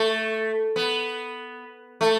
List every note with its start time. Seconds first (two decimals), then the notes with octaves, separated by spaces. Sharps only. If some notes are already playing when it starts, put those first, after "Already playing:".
Already playing: A3
0.76 B3
2.01 A3